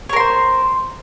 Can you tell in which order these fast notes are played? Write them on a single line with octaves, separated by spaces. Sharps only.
C#5 A#4 C6 C5